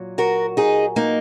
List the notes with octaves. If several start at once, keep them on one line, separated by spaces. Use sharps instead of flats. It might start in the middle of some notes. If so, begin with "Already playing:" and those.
Already playing: A#2 F#3
F#4 A#4
D#4 G#4
A#3 D#4